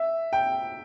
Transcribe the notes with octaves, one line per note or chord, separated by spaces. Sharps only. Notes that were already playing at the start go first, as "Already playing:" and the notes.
Already playing: E5
G5